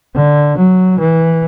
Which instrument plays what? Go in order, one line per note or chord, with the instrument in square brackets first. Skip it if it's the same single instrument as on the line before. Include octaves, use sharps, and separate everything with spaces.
[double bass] D3
F#3
E3